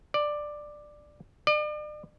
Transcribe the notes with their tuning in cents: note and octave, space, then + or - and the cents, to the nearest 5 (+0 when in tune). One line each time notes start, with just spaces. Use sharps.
D5 +10
D5 +40